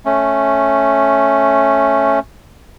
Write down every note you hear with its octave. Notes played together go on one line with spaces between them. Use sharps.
A3 C#4